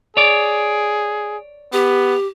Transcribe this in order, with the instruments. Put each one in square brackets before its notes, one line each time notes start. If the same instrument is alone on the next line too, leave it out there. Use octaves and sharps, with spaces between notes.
[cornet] G#4 [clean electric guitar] C#5 D5
[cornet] B3 [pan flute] G4